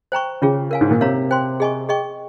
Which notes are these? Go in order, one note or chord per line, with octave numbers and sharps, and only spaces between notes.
C5 G5 A#5 C#6
C#3 C#4 F4 G#4
A#4 F5 G#5
G#2
A#2
C3 A#4 C#5 F5 A#5
C5 G5 C6
G#4 D#5 G#5 C#6
G#4 D#5 G5 C#6